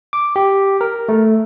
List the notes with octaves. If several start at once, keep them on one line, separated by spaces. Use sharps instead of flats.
D6
G4
A#4
A3